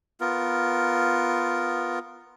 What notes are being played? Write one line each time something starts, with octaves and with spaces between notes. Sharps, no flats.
B3 F4 A#4